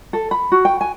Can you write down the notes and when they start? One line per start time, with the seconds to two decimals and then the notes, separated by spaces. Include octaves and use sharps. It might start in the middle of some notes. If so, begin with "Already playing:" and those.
0.13 A4
0.31 B5
0.52 F#4
0.65 G5
0.81 G#5